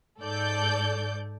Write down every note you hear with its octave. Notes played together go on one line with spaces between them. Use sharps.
G#2 A4 D5 G6